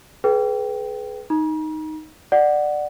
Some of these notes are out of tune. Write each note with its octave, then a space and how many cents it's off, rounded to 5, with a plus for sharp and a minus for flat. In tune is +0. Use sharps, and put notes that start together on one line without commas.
G#4 +35 B4 +0 G5 -10
D#4 +0 A#5 +40
D5 +15 F#5 +0